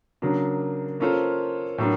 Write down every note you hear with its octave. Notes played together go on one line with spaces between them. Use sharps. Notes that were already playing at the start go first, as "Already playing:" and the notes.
C#3 F#3 A#3 D4
A#3 C#4 F4 A4 C5
A2 F#3 A#3 D4